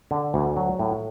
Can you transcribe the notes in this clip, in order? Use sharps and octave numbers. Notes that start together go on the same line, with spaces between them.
D3
D2
F#3
A2